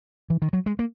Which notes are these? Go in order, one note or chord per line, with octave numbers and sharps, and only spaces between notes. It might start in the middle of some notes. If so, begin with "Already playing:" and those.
E3
D#3
F#3
G#3
A#3